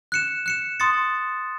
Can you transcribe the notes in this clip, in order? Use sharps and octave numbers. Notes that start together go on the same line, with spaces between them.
F#6 C#7 E7
F#6 C#7 E7
C6 D#6 A6 C#7